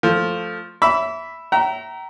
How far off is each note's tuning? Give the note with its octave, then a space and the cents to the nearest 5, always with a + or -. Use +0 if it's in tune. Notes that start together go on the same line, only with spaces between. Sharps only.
F3 +0 A3 +0
E5 +0 B5 +0 D6 -35
E5 +0 G5 -45 A#5 +0